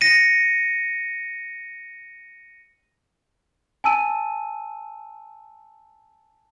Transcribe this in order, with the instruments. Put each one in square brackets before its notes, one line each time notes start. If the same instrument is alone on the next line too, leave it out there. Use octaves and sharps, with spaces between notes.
[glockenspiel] A#6 C#7 D#7
[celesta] G#5 A5 E6 D#7